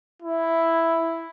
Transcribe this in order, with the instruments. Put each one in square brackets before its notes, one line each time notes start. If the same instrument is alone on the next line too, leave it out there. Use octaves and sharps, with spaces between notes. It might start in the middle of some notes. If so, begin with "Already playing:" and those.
[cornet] E4